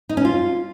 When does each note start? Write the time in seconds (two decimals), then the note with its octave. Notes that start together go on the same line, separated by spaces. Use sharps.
0.09 D#4
0.17 C#4
0.25 F4